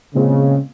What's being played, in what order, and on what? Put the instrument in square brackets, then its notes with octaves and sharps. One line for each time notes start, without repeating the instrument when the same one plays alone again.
[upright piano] A#2 G#3 C4 [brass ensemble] C#3